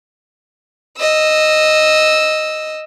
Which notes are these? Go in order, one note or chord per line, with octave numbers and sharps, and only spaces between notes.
D#5 E6